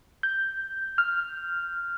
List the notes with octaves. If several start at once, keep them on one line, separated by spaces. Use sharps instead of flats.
G6
F6